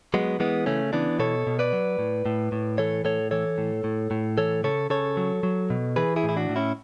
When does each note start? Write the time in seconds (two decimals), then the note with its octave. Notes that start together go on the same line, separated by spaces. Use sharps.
0.14 F#3 G#3 B3
0.40 E3 G#3 B3
0.66 C#3 A3 C#4
0.93 E3 B3 D4
1.19 B2 A4 C#5
1.47 B2
1.59 B4 D5
1.73 F#3
1.99 A2
2.26 A2
2.52 A2
2.78 E3 A4 C#5
3.05 A2 A4 C#5
3.31 E3 A4 C#5
3.58 A2
3.84 A2
4.11 A2
4.38 E3 A4 C#5
4.64 C#3 A4 C#5
4.90 C#3 A4 C#5
5.17 F#3
5.43 F#3
5.70 B2
5.96 E3 G#4 B4
6.16 E4 G#4
6.24 A2
6.29 E4
6.37 D4 F#4
6.49 A2
6.56 C#4 E4